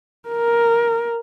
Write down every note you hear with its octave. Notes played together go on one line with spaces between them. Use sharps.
A#4